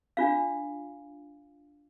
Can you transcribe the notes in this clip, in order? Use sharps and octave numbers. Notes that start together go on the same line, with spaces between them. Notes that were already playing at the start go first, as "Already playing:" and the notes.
D4 F4 F5